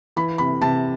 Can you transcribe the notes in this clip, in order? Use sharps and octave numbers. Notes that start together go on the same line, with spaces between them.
E3 B5
C3 B5
C3 A5